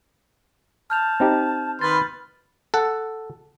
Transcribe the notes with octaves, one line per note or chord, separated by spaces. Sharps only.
A5 F6 G6 F7
C4 D#4 G4
D#3 B4 B5 C6 F6 A6
A4 F#5